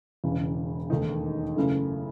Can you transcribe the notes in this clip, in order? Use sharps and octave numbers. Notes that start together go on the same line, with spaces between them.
E1 E2 C#3
E1 D#2 D#3 A3 D#4
F#2 C#3 E3 A3